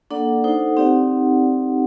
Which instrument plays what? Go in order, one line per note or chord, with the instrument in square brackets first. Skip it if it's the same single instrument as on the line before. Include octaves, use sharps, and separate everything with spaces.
[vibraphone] A#3 D4 A4 D5 F#5
D#4 A4 C5 F#5
C4 D#4 G4 D5 F#5